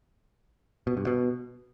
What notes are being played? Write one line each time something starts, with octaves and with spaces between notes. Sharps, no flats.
B2
G2
B2